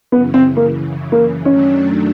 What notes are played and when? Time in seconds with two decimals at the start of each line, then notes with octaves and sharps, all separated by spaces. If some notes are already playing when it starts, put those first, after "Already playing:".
0.12 F#2 C#3 E3 B3
0.34 C4
0.57 A#3
1.12 A#3
1.45 F#2 D#3 F#3 A3 C#4 D4